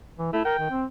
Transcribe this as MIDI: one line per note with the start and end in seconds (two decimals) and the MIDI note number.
0.19 0.30 52
0.33 0.44 57
0.33 0.42 64
0.45 0.56 70
0.45 0.76 79
0.59 0.70 51
0.71 0.85 60